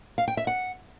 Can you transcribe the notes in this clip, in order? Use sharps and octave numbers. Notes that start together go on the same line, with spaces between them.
F5
G5
E5
F#5